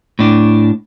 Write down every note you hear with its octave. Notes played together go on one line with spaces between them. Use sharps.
A2 D4